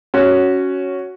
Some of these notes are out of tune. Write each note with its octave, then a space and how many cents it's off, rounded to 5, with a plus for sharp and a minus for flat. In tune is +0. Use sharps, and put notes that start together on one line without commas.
C#4 +0 F#4 +0